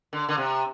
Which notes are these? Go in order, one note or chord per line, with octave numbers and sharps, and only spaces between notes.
D3
D3
C3